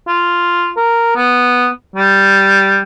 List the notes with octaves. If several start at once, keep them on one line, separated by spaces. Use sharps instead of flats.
F4
A#4
B3
G3